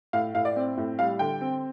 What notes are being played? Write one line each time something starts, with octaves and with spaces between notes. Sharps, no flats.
A2 F5
A2 F5
D5
C4
A2
G3 F5
D3 G5
C4